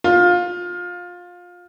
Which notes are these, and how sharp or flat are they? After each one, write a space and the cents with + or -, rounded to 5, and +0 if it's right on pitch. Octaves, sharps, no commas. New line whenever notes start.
F4 +20